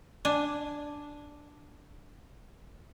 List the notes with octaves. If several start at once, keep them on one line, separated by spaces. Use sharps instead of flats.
D4 G#5